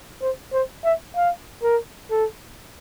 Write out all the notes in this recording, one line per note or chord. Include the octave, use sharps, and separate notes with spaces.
C5
C5
E5
F5
A#4
A4